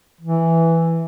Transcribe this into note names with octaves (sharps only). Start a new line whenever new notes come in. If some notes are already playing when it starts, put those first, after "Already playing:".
E3